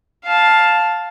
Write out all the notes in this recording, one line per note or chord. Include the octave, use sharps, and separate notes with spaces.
F5 A5